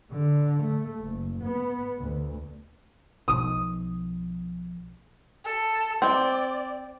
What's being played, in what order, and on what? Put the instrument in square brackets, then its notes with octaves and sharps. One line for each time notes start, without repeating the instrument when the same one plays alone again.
[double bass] D3
A3
F#1
B3
D2
[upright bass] B1 F3 [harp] D#6
[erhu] A4
[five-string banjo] C4 [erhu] D5